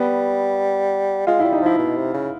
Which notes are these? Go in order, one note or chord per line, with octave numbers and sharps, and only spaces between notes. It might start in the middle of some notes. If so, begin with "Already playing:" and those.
Already playing: G3 B3
G#3 F4
E4
G3
D#4
F3 E4
B2
C3
C#3